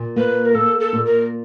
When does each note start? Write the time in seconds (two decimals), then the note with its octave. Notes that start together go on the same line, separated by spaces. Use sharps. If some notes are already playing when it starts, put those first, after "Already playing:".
Already playing: A#2
0.16 A#3 B4
0.45 A#4
0.54 A#3 A4
0.80 A4
0.93 A#2
1.05 A#4